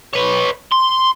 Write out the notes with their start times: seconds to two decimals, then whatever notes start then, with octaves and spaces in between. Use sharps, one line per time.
0.13 B4 C#5
0.72 C6